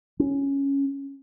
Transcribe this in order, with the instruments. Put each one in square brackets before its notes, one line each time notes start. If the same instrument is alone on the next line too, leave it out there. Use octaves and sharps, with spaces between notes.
[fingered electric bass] C#4